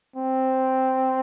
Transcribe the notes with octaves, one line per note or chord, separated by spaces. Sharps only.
C4